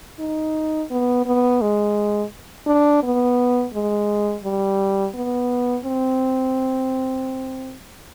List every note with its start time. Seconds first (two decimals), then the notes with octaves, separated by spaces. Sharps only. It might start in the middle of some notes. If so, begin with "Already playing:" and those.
0.20 D#4
0.91 B3
1.26 B3
1.61 G#3
2.67 D4
3.03 B3
3.74 G#3
4.44 G3
5.15 B3
5.85 C4